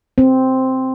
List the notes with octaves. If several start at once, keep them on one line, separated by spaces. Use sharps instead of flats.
C4